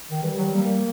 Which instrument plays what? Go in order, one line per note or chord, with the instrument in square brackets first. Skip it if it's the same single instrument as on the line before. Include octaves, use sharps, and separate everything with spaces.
[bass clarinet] D#3
[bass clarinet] E3 [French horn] G3
[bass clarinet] F#3
[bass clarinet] G3 [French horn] A#3